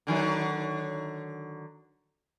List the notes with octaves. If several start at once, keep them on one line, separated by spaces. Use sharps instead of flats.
D3 D#3 F#3